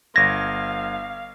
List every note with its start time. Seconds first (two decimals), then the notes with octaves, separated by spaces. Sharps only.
0.16 G1 F5 G#6 A#6